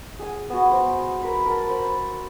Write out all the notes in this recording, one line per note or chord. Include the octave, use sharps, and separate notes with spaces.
G#4 G#5
B3 F#4
C5
A#4 B4
A#4 A5
C5 B5